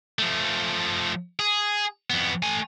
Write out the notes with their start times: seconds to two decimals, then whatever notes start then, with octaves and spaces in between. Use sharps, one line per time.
0.19 F3 A3
1.39 G#4
2.10 F2 B3
2.43 A3 G#5